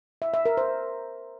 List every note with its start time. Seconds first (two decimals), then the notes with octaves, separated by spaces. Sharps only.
0.22 E5
0.34 E5
0.46 A#4
0.57 C5